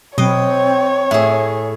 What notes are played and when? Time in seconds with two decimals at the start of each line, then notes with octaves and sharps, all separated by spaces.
0.18 B2 F#3 C4 C#5 D#5
1.11 A2 G#4 E5